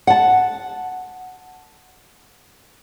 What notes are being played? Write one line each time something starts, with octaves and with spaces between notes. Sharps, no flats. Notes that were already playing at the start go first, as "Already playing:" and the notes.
F#5 A5